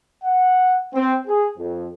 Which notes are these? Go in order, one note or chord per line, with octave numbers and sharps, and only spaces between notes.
F#5
C4
G#4
F2